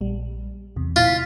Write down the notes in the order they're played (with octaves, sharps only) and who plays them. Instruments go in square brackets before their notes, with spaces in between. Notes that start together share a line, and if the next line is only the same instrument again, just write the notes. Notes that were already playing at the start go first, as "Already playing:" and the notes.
[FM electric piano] A#1 G3
E2 C3
[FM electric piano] E4 B6 [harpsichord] F4